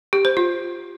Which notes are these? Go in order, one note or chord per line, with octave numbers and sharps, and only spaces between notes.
G4
C5
F4